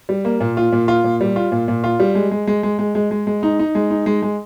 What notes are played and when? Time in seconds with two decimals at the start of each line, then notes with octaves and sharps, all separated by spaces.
0.09 G3
0.25 A#3
0.40 A#2
0.57 F4
0.72 A#2
0.88 F4
1.04 A#2
1.21 G3
1.36 F4
1.52 A#2
1.68 A#2
1.84 F4
2.00 G3
2.15 G#3
2.31 G#3
2.47 G#3
2.63 G#3
2.79 G#3
2.95 G#3
3.11 G#3
3.27 G#3
3.43 D#4
3.59 D#4
3.75 G#3
3.90 D#4
4.06 G#3
4.22 G#3